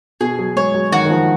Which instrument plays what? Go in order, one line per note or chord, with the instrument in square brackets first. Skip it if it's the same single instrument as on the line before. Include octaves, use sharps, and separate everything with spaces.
[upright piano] B2 [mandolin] G#4
[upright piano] F#3
[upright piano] G#3 [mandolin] C#5
[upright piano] F#3
[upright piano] D#3 [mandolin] F#4
[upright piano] D#3
F3